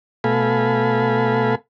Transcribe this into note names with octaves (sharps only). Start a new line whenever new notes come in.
B2 A3 A4 F5 G#5 B5